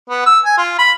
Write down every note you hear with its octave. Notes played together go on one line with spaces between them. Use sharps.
B3
E6
G#5
F4
B5